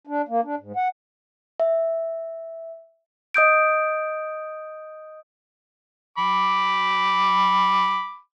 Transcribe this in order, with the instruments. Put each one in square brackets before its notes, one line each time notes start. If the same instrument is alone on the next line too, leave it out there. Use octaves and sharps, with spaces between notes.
[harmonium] D4
A#3
D4
G#2
F#5
[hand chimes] E5
D#5 D#6 G6 D7
[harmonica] B5 D6